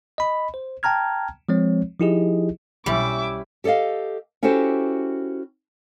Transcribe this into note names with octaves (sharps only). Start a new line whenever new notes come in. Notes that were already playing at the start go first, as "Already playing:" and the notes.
D#5 B5
C5
G5 A5 A#5 F6 G#6
F3 G#3 C4 C#5
F3 D#4 E4 G4 G#4 D#5
B1 G3 C#4 E4 E5 B5 D6
G4 A4 D5 D#5 F5
C#4 E4 F#4 G4 A4 C5